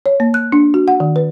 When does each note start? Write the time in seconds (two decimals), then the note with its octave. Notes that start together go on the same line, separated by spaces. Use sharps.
0.06 C#5
0.20 A#3
0.34 F#6
0.52 D4
0.74 F#4
0.88 F#5
1.00 D#3
1.16 B4